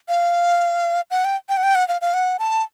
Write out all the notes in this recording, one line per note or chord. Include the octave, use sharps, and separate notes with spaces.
F5
F#5
G5
G5
F#5
G5
F#5
F5
F5
F#5
A5